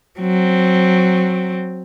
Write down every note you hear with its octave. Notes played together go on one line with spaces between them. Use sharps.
F#3 C4